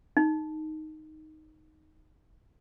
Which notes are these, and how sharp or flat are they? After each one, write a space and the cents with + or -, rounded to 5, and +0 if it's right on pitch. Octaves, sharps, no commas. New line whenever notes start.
D#4 +0